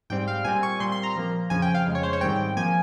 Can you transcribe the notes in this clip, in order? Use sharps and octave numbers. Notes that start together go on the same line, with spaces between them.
G#2 G3 C4 G5
F5
A#2 G3 C4 G#5
C#6
A#2 G3 C4 C6
C6
A#5
A#2 F3 A#3
F2 C#3 F3 G#5
G5
F5
F2 C#3 G#3
C#5
C5
C#5
G#2 D#3 G3 C4 G5
F3 A#3 G#5